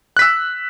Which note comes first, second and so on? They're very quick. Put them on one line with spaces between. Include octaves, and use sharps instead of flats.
F#6 B6 E6